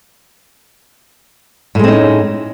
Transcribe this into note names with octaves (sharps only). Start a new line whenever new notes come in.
A2 G#3 C4 C#4 D#4